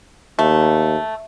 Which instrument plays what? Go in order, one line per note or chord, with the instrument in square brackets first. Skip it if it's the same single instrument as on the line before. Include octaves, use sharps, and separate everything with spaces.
[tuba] D#2 [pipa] A3